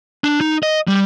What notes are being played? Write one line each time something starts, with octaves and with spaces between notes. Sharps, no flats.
D4
D#4
D#5
G3